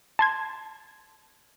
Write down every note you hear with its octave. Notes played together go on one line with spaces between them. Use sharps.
A5 C6 G#6